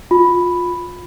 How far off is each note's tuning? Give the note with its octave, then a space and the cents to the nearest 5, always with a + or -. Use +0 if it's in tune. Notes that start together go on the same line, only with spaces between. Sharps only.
F4 +20 B5 +0